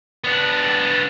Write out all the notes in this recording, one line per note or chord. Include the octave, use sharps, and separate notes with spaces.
B3 D4